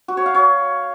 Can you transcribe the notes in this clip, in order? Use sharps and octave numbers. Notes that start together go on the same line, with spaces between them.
F#4
C#5
F5
C#5